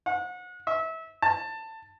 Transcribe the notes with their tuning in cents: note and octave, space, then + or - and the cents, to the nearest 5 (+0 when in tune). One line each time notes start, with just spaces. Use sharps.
F#5 -35
E5 -25
A5 +15